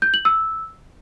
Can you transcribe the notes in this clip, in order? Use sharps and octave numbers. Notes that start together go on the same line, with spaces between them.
G6
F#7
E6